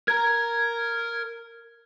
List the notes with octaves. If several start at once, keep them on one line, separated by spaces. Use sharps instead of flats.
A#4 A#5 G#6